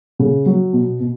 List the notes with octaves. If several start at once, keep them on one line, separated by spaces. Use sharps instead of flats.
C#3
F#3
B2
B2